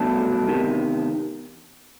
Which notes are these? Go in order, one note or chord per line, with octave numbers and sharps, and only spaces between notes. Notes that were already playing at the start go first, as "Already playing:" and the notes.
Already playing: C2 B2 F#3 A3 D4
E2 C3 D#3